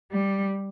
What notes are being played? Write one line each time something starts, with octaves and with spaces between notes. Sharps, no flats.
G3